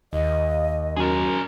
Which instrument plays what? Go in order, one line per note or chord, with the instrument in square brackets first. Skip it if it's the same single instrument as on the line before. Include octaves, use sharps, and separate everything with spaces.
[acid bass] D#2 [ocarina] D#5
[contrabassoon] F#2 [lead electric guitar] G#4 A#4